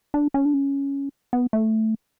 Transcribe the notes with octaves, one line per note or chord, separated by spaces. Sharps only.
D4
C#4
D4
C#4
B3
A3